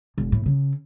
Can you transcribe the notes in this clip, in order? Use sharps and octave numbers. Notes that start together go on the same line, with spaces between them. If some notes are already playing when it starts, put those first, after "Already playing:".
E1
A2
C#3